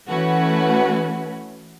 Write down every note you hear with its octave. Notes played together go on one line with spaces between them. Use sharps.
E3 A3 C#4 F#4 B4